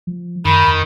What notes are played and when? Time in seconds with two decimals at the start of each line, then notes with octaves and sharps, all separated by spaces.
0.07 F3
0.45 F#2 D#3 B5
0.67 F2